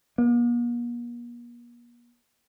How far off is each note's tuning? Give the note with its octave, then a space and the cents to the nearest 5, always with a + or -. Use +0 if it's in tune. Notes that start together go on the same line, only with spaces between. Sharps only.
A#3 +45